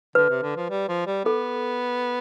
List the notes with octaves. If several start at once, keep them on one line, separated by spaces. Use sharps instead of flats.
D3 B4
C3
D3
F3
G3
F3
G3
B3 A4